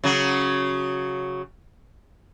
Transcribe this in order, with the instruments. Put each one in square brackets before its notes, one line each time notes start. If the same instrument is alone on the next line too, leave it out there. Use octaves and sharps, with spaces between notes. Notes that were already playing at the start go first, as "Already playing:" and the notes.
[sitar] C#3 F#3